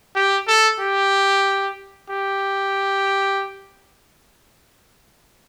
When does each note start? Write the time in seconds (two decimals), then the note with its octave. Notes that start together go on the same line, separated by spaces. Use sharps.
0.15 G4
0.47 A4
0.80 G4
2.10 G4